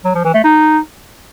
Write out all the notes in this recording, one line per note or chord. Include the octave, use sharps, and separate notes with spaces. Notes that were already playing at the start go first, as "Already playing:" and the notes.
F#3
F3
E3
A3
D#4